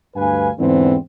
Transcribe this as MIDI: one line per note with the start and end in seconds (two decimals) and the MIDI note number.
0.16 0.50 38
0.16 0.50 43
0.16 0.50 71
0.16 0.50 77
0.16 0.50 80
0.59 0.96 40
0.59 0.96 44
0.59 0.96 50
0.59 0.96 52
0.59 0.96 59
0.59 0.96 60